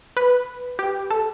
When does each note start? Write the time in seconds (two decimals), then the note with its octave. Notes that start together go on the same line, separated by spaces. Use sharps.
0.17 B4
0.79 G4
1.11 A4